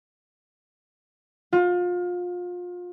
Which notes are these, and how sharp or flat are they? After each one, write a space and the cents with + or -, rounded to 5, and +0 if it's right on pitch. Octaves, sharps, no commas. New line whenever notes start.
F4 +30